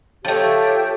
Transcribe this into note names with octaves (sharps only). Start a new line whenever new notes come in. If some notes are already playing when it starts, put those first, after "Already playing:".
F3 A3 G4 A4 C#5